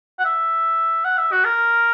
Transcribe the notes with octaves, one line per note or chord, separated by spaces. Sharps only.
F#5
E5
F#5
E5
F#4
A#4